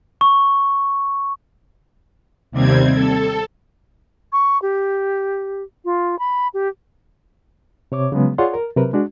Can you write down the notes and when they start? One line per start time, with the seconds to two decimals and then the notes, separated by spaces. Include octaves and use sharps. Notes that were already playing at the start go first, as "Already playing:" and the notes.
0.21 C#6
2.51 D#2 C3 G3 C4 G#6
2.94 A4
4.33 C#6
4.62 G4
5.85 F4
6.19 B5
6.54 G4
7.92 C3 C#5 D6
8.12 C#3 F#3 G#3 B3
8.38 F4 G#4 C#5 D5 F#5 C6
8.54 A#4
8.76 C3 F#3 A#4 B4
8.93 G#3 D4 F#4